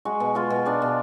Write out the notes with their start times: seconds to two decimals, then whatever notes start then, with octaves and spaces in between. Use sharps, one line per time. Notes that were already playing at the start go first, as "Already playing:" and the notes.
0.05 G#3 F#4
0.20 B2
0.35 G#3 F4
0.50 B2
0.66 G#3 D4
0.82 B2